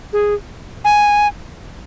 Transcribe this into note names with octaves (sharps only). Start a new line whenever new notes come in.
G#4
G#5